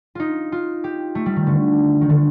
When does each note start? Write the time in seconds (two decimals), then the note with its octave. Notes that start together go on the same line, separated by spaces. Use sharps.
0.15 D#4 F4
0.52 F4
0.84 G4
1.15 A3
1.26 G3
1.36 D#3
1.47 D3
2.01 D#3
2.10 D3